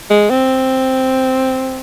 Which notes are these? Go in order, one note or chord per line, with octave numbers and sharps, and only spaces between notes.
G#3
C4